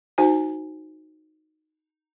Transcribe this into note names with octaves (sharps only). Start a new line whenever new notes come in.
D#4 F#4 C5 G#5